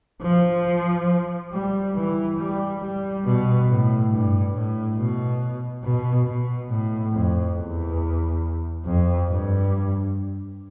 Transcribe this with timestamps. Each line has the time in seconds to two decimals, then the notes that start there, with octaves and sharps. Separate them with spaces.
0.23 F3
1.53 G3
1.95 E3
2.38 G3
2.81 G3
3.25 B2
3.68 A2
4.12 G2
4.54 A2
4.97 B2
5.84 B2
6.27 B2
6.70 A2
7.13 F2
7.57 E2
8.86 F2
9.29 G2